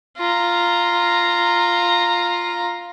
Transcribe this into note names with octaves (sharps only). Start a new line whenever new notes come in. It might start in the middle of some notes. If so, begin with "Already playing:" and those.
F4 A#5